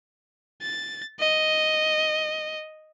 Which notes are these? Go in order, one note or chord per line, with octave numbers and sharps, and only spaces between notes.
A6
D#5